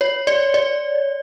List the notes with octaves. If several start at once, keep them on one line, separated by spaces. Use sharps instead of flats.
C#5
D5
D5